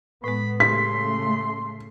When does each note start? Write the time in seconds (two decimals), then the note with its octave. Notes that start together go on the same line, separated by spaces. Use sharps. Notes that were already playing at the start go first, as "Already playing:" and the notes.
0.24 A2 G#3 B3 B5
0.60 C#3 A3 G4 C6 B6